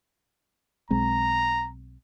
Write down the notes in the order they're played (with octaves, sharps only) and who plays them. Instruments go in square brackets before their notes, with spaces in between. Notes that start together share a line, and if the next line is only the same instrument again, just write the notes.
[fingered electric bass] B1 G#3 C4 [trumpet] A#5